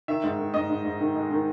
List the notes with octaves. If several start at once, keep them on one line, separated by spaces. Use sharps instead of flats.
D#3 E5
G#2
D#3
G#2 D#5
G#2
G#2
D#3
G#3
D#3